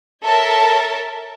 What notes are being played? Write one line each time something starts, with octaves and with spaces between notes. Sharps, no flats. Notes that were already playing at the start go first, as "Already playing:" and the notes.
A4 A#4 C#5 E5 A5